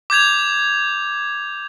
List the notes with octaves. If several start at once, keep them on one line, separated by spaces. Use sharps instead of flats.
D6 G6 G#6 F7